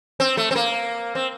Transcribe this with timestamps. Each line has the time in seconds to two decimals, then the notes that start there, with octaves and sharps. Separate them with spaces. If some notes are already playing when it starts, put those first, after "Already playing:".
0.20 C4
0.37 A3
0.51 C4
0.55 A#3
1.15 C4